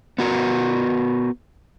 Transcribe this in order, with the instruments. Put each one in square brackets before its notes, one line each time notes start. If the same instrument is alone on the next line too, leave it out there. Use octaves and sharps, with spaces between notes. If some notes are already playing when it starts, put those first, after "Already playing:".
[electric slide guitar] B3 F#4 A#4